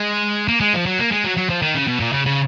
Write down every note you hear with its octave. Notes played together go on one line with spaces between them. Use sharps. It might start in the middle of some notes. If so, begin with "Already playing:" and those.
Already playing: G#3
A#3
G#3
F3
F#3
A#3
G#3
F#3
F#3
F3
D#3
C#3
B2
A#2
C#3
C#3